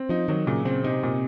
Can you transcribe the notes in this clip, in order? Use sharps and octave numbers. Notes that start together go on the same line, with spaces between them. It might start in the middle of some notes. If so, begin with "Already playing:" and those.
Already playing: C4
F3 D#4
D#3 F#3
A#2 C#3
C#3 C4
C3 D#4
A#2